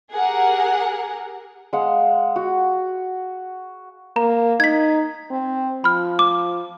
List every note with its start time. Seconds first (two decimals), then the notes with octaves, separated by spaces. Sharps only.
0.12 G4 G#4 A#4 F#5
1.73 G#3 F5 F#5
2.36 F#4
4.16 A#3 A#5
4.60 D#4 G#6 B6
5.31 C4
5.84 F3 B5 F6
6.19 D6